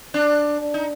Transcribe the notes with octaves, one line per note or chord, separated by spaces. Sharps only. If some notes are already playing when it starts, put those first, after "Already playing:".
D4
D#4